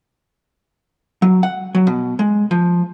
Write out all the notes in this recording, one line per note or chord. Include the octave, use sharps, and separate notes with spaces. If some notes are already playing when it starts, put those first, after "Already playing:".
F#3
F#5
F#3
B2
G#3
F3